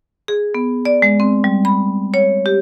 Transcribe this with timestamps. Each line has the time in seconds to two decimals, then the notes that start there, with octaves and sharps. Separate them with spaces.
0.28 G#4
0.55 B3
0.85 D5
1.02 G#3
1.20 C4
1.44 G3
1.65 B5
2.14 C#5
2.46 G4